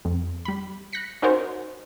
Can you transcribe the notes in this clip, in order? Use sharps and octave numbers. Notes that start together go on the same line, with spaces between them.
F2
G3 B5
F#6 A#6 B6 C#7
C#4 D#4 F#4 A#4 C5 C#5